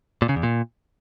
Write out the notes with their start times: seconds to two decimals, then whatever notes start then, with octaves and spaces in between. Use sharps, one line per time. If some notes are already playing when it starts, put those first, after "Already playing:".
0.22 A#2
0.29 C#3
0.36 E2
0.43 A#2